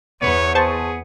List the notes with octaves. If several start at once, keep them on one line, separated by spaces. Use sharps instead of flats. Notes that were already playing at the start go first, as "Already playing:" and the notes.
E2 B3 B4 C#5
G#4 C5 A5 C#6